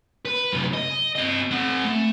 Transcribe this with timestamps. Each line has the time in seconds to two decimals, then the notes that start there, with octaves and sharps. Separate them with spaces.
0.25 B4
0.53 F#2 C3
0.73 D#5
1.15 C4 D#5
1.51 C4 F#5
1.85 A3